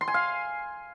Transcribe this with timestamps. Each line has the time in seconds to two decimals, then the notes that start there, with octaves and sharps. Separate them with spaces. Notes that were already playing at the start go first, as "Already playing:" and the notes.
0.01 C6
0.08 G#5
0.14 F5